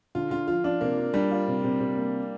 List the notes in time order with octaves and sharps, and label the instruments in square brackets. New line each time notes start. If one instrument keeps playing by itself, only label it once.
[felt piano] D3 [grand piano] F4
[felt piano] D3 [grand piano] F4
[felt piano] F3 [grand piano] F4
[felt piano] F3 [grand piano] D4
[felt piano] C3 [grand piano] A#3
[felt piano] D4
[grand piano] G3 [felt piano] D4
[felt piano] F4
C3
C3
C3
A#3